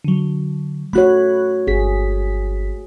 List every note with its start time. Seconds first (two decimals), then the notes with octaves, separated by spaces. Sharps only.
0.04 D3 F#3
0.93 A3 F#4 C#5 B5 F#6
1.67 G1 G#4 B6